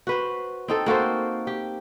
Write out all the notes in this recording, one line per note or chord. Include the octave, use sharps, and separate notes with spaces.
F#4 B4 C5
C4 D#4 A4
A#3 F#4 A4 C5
G4